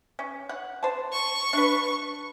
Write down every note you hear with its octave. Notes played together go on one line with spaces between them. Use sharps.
C#4
F#5
C5 A5
C#6
D4 B4